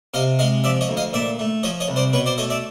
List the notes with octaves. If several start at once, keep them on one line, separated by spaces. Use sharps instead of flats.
C3 D#5 F5
G#3 D#5 F5
F3 D5 E5
C#5 D#5
D2
D#5 F5
A#2 D5 E5
A3
F3 C#5 D#5
C#5 D#5
C2
C5 D5
B2 B4 C#5
C5 D5
A3 C#5 D#5
D5 E5